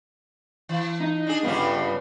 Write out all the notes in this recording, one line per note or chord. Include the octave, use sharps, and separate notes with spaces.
E3
D#4
D4 G#4
G2 C#3 G3 B3 C#4